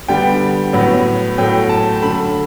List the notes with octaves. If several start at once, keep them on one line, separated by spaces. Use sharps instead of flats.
D3 G3 B3 G5
A2 F#3 B3
A2 F#3 A3 G5
A5
D3 A3 B5